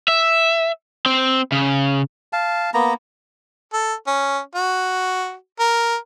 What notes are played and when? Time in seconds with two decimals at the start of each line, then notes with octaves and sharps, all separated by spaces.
0.08 E5
1.06 C4
1.52 C#3
2.33 F5 A5
2.74 A#3 B3 A#5
3.73 A4
4.07 C#4
4.55 F#4
5.60 A#4